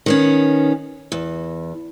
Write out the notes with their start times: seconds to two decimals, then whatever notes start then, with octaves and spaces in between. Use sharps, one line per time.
0.06 D#3 B3 C#4
1.12 E2